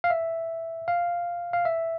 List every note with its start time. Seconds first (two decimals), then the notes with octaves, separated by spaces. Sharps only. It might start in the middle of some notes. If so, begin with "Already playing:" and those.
0.04 F5
0.10 E5
0.88 F5
1.53 F5
1.65 E5